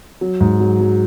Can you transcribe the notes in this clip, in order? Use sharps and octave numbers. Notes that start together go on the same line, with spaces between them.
F#3
G#2
F#3
F#3